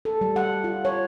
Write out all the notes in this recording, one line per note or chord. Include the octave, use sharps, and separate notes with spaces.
A4
G3
F#5
F4
C#5